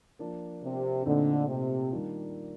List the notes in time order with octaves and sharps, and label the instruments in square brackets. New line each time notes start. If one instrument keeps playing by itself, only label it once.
[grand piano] F3 A#3 D4
[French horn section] C3
[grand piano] A#2 A3 C4 D#4 [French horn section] D3
[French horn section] C3
[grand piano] D#3 G3 A#3 D4 F4